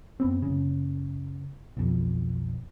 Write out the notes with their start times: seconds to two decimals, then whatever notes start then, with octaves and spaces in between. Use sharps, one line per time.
0.20 F#2 B3 C4
0.42 F#1 C#3
1.77 B1 F2